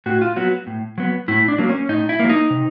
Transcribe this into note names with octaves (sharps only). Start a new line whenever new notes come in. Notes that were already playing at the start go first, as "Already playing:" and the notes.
A2 F#4
F4
F#3 B3 F#4
A2
F#3 B3
A2 E4
D4
F#3 A#3
C#4
A2 D#4
E4
F#3 A#3
D#4
C3